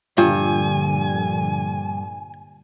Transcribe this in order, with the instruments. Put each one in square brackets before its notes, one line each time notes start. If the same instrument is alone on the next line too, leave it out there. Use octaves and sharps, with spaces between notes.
[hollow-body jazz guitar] G2 [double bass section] A#2 D3 F3 [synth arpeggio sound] F4 [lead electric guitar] G#5